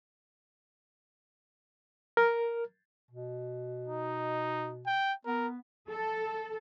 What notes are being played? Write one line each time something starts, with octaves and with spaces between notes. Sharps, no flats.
A#4
B2
D#4
G5
B3 A#4
A4